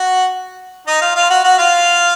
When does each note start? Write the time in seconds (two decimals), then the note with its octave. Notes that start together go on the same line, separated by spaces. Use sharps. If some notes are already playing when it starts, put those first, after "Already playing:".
Already playing: F#4 F#5
0.87 D#4 D#5
1.01 F4 F5
1.16 F4 F5
1.30 F#4 F#5
1.44 F#4 F#5
1.58 F4 F5